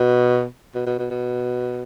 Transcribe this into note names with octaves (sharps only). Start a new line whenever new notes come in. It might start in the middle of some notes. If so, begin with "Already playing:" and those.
Already playing: B2
B2
B2
B2
B2